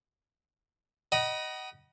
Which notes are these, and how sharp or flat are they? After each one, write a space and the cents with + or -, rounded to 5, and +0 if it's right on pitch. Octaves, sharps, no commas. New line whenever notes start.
D#5 +0 F#5 +35 B5 -35